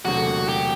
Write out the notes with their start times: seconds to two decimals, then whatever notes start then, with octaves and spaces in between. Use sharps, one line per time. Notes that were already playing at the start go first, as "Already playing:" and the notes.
0.04 E1 D2 C3 F#3 F#4
0.49 G4